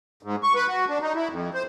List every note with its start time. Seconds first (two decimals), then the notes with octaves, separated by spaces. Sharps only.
0.23 G#2
0.43 C#6
0.55 B4
0.67 F#4
0.88 D4
1.02 D#4
1.15 E4
1.29 F2
1.54 C5